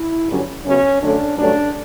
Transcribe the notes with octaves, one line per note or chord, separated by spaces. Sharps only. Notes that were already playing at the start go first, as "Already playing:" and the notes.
Already playing: E4
G2 D3 F#3 C#4
F#2 C#3 F#3 B3 C#4
F#2 D3 A3 C#4 D4
G2 F#3 A3 C#4 D4